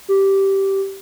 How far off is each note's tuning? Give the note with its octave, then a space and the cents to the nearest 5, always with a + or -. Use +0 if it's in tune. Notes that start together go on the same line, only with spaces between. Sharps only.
G4 -10